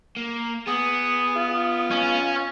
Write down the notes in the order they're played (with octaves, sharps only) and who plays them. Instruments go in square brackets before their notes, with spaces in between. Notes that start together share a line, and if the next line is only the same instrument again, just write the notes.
[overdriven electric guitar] A#3
[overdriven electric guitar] B3 [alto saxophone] G#4 [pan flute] D#6
[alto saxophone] F4
[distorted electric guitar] C#4